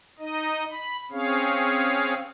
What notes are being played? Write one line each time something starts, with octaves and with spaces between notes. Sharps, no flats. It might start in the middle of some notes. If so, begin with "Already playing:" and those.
D#4 D#5
B5
C4 C#4 G#4 C#5 F5